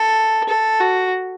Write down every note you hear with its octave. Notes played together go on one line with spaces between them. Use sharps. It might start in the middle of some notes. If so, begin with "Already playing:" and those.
Already playing: A4
A4
F#4